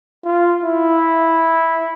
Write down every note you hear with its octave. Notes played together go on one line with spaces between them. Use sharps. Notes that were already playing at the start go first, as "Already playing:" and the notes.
F4
E4